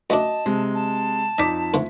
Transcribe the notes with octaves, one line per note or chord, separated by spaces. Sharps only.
F#2 A3 D4 D#5 A5
C3 G#3
A5
F2 D#4 D5 D#5 B6
G#2 D3 A3